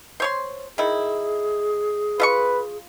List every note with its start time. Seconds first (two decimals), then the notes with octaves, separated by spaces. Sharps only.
0.20 C5 C#5 C6
0.78 D#3 E4 G#4
2.20 F4 B4 E5 C#6